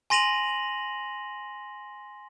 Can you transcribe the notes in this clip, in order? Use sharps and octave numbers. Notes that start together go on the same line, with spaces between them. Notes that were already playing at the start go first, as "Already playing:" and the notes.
G#5 C6 A#6 D#7 F7 F#7